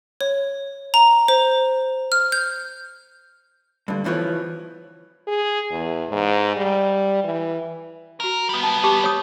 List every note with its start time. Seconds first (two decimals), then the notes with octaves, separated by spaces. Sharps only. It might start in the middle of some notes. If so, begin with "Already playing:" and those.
0.21 C#5
0.94 A#5
1.28 C5
2.12 F6
2.32 G6
3.88 G2 D3
4.04 E2 B2 E3 F3 C#5
5.27 G#4
5.71 E2
6.09 G#2
6.56 G3
7.24 E3
8.20 F#4 A#4 A#5
8.49 G3 B3
8.63 A5
8.84 G4 A5 D6
9.04 C#5 D6 D#6